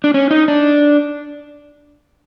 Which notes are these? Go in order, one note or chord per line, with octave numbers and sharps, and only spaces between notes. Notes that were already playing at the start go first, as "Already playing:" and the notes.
D4
C#4
D#4
D4